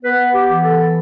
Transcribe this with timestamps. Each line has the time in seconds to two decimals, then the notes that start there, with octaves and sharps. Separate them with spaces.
0.03 B3 B4
0.33 G4
0.48 E3
0.63 A4